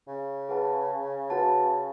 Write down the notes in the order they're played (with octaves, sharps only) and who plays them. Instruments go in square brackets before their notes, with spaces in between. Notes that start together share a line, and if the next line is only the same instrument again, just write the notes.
[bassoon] C#3
[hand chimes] G#4 B4 F#5 A5
F#4 B4 F#5 A5